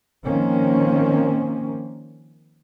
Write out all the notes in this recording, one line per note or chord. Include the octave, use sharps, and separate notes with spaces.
D#3 F3 A#3 C4 C#4